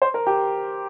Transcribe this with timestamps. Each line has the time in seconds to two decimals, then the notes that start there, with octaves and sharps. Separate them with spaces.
0.02 C5
0.14 A#4
0.27 G4